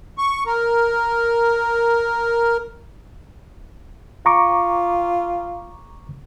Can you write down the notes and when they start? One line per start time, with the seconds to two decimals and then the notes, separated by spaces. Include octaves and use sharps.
0.18 C#6
0.46 A#4
4.26 F4 A#5 C#6 D6